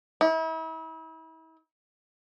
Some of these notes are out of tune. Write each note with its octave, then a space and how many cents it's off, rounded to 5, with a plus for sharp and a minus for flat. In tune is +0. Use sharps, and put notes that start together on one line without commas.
E4 -40